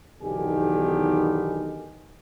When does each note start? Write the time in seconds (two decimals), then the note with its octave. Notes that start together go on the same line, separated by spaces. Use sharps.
0.22 B1 E2 D3 D#3 G4 G#5